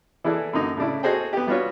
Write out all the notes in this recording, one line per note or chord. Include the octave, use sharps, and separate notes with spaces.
E3 E4 G#4 A4 D5
F#2 D3 A#3 D#4
A2 C#3 D4 E4
F#4 G#4 A4 C5 D#5 G5
B3 G4
G3 B3 D4 F4 F#4 C#5